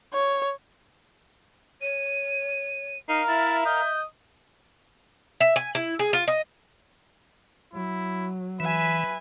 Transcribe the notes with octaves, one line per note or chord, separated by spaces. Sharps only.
C#5
C#5 D#7
D#4 A#4 F5 A#5 C7
E4 E5 A6
D#5 G6
E5
G#5
E4
G#4
F4
D#5
F#3 E4
E3 B4 E5 G#5